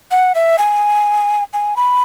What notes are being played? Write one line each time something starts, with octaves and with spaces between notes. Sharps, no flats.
F#5
E5
G#5
G#5
B5